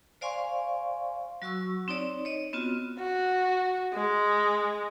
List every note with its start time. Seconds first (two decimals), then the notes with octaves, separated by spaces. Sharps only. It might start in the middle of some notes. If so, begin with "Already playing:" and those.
0.21 C5 D5 F5 G#5 C6 C#6
1.42 F#3 F#4 C#6 E6
1.88 C4 D#4 C#5 D5
2.25 C#5 D#5
2.53 B3 C4 F4 F#4
2.99 F#4
3.94 G#3